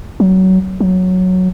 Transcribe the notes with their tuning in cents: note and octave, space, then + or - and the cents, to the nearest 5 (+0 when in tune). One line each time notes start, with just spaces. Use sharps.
F#3 +20
F#3 -5